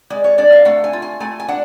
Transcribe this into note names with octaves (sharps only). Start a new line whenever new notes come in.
G#3 D5
C#5
D4 D5
F5
A3 F#5
G#5
F4
G#5
A3 G#5
G#5
D4 F#5